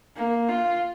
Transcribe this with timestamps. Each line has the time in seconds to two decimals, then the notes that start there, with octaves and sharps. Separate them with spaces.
0.16 A#3
0.49 F4